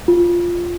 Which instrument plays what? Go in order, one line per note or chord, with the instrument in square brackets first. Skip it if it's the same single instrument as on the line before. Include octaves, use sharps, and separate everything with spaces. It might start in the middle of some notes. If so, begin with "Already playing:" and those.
[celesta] F4